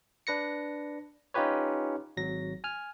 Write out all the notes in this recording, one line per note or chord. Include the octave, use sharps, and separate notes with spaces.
D4 B4 A#6 C#7
C#4 D#4 F4 G4 B4 C#5
G#1 F#3 A#6
G#5 F6